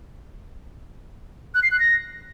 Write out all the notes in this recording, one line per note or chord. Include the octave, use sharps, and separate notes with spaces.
F#6
C7
F#6
A#6